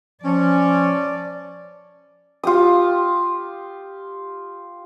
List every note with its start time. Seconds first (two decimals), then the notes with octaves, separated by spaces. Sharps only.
0.24 F3 C#4 D5
2.43 F4 G4 D#6